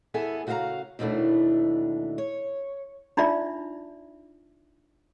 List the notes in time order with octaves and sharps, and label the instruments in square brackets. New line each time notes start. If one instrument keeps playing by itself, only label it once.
[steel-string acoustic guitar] E2 B3 G#4 A4 E5 G#5
C#3 F#4 B4 E5 F5 A#5
D#2 B2 D#3 E3 A3 D4
C#5
[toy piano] D4 D#4 F4 D5 E5